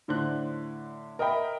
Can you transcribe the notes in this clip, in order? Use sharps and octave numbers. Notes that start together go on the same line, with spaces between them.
A2 D3 C5 F#6
A#4 D#5 E5 G5 B5